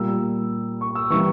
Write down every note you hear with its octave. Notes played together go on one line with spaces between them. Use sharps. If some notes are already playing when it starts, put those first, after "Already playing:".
Already playing: A#2 G3 A#3 E6
C#6
E6
E3 G3 A#3 C#6